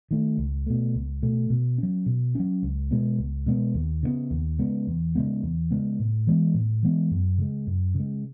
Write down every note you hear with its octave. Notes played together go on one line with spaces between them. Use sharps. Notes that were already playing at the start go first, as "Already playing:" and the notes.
D#3 A3
C#2
B2 A3
C#2
B2 A3
B2
F#3 C#4
B2
F#3 C#4
C#2
B2 G#3 B3
C#2
B2 G#3 B3
D#2
C#3 G#3 B3
D#2
C#3 G#3 B3
E2
C#3 G#3 B3
E2
C#3 G#3 B3
A2
E3 G#3 B3
A2
E3 G#3 B3
F#2
C#3 G#3
F#2
C#3 G#3